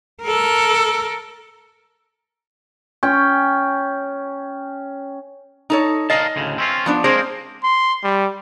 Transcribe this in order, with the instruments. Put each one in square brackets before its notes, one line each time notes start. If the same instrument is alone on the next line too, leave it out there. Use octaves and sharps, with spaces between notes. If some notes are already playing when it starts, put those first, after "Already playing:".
[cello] A4 A#4
[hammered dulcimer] C#4 G5
[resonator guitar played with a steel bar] D#4 A4 C#5
[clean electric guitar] A#4 F5 A5 [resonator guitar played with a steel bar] D#5 G#5
[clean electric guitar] D2 A2 C#3
C4 C#4 F4
[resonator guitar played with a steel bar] F3 B3 D4
[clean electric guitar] G#3 A#3 A#4 [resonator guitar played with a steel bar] C4 G#4 C5
[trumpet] C6
G3